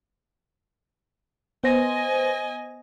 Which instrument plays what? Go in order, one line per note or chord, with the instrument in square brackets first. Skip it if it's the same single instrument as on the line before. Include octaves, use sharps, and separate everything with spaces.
[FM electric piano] B3 C5 A#6 [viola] D#5 G#5